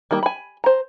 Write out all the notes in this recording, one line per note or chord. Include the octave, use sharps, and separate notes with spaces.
D#3 G3 A#3
G#5 B5
C5 A#5